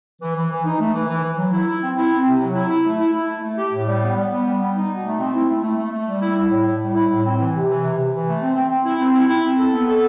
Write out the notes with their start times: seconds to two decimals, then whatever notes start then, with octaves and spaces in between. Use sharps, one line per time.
0.22 E3
0.36 E3
0.51 E3
0.65 D#4
0.80 A3
0.95 E3
1.09 E3
1.24 E3
1.38 F#3
1.53 E4
1.68 E4
1.83 C4
1.97 E4
2.12 C4
2.27 C3
2.41 F#3
2.55 E4
2.70 E4
2.84 A3
2.99 E4
3.14 E4
3.29 A3
3.43 A3
3.58 G4
3.73 A2
3.87 G3
4.02 B3
4.17 G3
4.31 B3
4.46 G3
4.61 B3
4.75 D#4
4.90 B2
5.04 A3
5.19 C4
5.33 E4
5.48 A3
5.63 A3
5.78 A3
5.92 A3
6.07 G3
6.22 E4
6.36 E4
6.51 A2
6.65 A2
6.80 G3
6.95 E4
7.09 A2
7.24 C4
7.38 E3
7.53 C3
7.68 E3
7.83 C3
7.97 C3
8.12 E3
8.26 A3
8.41 C4
8.55 C4
8.71 C4
8.85 E4
9.00 C4
9.14 E4
9.29 E4
9.43 C4
9.58 A4
9.72 B3
9.87 A4